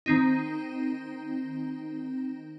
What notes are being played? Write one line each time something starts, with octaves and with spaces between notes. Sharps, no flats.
D#3 C4 D#4